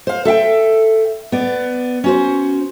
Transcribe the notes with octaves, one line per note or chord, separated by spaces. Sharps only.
C5 F5
A4 E5 F5 G5
B3 D5
C#4 F#4 C5